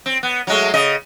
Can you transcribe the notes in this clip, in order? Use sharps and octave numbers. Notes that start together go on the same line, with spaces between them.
C4
B3
F#3 G#3 A3
C#3 D#5